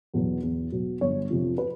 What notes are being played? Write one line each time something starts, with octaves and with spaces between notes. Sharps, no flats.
E2 B2 F#3 B3
E2
B2 F#3
G1 C#5
F2 C3 F3
B4